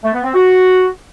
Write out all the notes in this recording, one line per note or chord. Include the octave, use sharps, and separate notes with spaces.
A3
B3
C4
F#4